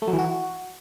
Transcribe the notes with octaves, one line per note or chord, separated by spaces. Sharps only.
A3
F#3
E3
F#4